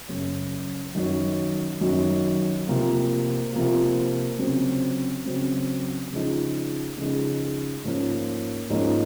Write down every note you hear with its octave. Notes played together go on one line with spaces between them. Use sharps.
F#2 C#3 F#3 C#4
F#2 D#3 F#3 C#4
F#2 D#3 F#3 C#4
C3 F3 A#3 F4
C3 F3 A#3 F4
C#3 F#3 C4
C#3 F#3 C4
C#3 F3 G#3 D#4
C#3 F3 G#3 D#4
G#2 F3 A#3 C#4
G#2 F3 A#3 C#4